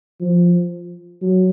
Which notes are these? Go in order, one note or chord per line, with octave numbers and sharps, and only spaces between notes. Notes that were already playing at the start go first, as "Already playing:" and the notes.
F3
F#3